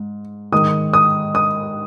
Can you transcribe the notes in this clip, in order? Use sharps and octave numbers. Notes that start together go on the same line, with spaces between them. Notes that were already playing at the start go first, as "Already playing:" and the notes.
Already playing: G#2
G#2 D#3 D#6
D#6
D#6